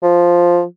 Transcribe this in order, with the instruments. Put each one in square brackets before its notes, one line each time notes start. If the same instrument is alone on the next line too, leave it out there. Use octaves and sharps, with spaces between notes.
[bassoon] F3